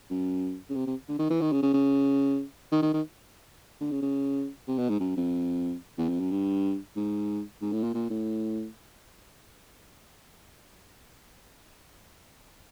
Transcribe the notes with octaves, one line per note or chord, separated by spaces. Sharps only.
F#2
C#3
C3
C3
D3
D#3
E3
D#3
C#3
C#3
C#3
D#3
D#3
D#3
D3
C#3
C#3
C3
B2
G#2
F#2
F2
E2
F2
F#2
G2
G#2
G#2
A2
A#2
A#2
A2